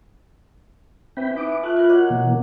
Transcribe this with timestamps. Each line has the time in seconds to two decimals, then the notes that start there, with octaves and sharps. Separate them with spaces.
1.17 E3 C4 G5 B5
1.37 E3 D#4 D6
1.63 A3 F4 F#6
1.77 E4 F4 A#4
1.89 F#3 D#5 F#5 D6
2.10 B2 E3 A#3